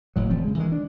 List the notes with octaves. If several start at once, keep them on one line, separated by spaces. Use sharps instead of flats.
F#1 D2 A2 F#3
E1 E3 F3 C4
C#3 G#3
D#3 E3 G#3
D4